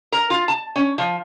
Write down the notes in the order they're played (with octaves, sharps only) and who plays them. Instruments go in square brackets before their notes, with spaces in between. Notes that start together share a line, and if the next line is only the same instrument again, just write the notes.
[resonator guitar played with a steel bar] A#4
F4
A5
C#4
F3